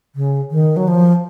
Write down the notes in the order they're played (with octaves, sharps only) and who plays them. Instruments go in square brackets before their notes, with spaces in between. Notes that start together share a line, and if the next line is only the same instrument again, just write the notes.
[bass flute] C#3
D#3
F#3
F3